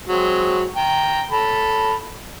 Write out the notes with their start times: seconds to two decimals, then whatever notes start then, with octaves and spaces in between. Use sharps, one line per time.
0.08 F#3 G#3 C4
0.76 G5 A#5
1.31 A4 B5